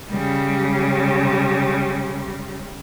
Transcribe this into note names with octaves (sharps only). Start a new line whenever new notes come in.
C#3 G3